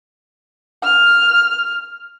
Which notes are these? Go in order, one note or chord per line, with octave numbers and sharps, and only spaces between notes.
F6